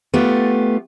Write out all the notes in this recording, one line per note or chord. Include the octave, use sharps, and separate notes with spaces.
A3 B3 F4 G4